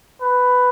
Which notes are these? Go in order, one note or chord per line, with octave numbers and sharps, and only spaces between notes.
B4